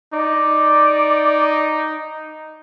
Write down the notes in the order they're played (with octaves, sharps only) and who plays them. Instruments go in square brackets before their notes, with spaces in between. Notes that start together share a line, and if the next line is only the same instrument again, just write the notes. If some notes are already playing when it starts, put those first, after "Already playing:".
[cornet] D#4 [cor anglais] D5